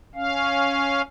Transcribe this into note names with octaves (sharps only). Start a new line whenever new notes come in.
C#4 F5